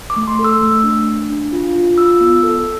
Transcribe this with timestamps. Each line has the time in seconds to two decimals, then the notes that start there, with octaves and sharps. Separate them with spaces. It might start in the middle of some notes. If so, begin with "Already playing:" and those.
0.10 D6
0.16 A3
0.28 C6
0.39 A4
0.44 E6
0.61 A3
0.84 D4
1.06 D4
1.30 D4
1.53 F4
1.75 F4
1.98 F4 E6
2.21 B3
2.43 A4